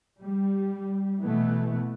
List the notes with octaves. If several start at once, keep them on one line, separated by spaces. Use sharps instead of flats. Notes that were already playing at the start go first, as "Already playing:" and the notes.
G3
B2 E3 A3 B3